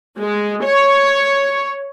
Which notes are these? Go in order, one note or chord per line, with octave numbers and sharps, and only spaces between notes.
G#3
C#5